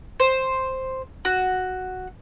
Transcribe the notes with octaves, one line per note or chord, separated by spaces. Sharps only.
C5
F#4